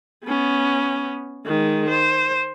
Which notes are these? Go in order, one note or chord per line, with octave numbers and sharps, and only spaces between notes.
B3 C#4
D#3 G#3
C5